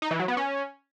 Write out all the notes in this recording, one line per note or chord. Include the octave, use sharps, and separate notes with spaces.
D#4
E3
F#3
B3
C#4